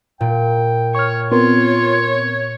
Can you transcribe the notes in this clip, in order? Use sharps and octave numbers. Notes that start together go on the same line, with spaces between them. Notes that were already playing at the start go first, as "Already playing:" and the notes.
A#2 G5
C#5 C#6 F6
B3 C4 F4 A#4 C#5